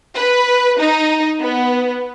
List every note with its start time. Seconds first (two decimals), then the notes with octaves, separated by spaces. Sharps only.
0.15 B4
0.79 D#4
1.41 B3